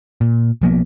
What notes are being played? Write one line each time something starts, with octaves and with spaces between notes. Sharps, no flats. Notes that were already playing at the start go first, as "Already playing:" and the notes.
A#2
B1 F3 A#3 B3